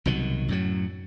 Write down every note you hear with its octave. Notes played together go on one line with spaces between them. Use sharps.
C2 B2 D#3 F#3
F#2 A2 F#3